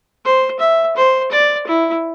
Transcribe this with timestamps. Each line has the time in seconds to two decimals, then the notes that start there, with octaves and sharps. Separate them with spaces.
0.25 C5
0.60 E5
0.97 C5
1.31 D5
1.67 E4